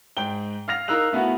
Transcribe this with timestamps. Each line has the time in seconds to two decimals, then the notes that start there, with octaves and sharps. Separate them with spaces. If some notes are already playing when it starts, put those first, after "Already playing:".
0.17 G#2 G5 G7
0.68 F5 F6 A#6 F7
0.88 D#4 A#4 F5 E6 F#6 F7
1.13 A3 B3 E4 F#4